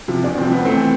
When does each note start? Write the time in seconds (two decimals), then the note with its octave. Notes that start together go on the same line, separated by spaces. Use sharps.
0.08 C3 F3
0.23 E2 D4
0.38 C3 F3 C4
0.52 F1 B3
0.65 A3 C4
0.76 E3